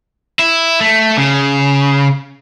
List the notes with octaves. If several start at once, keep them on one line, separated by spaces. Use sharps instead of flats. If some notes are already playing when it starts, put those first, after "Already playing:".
E4
A3
C#3